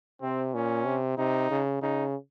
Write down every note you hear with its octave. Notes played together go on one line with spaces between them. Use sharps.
C3 C4
A#2 C#4
C3
C3 D#4
C#3
C#3 D#4